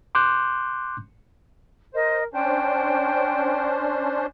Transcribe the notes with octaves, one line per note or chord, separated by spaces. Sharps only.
C6 D6 F#6 G6
A#4 C5 D#5
C#4 D4 C5 G5